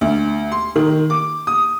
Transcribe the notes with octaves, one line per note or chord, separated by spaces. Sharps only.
D2
C6
D#3
D6
D#6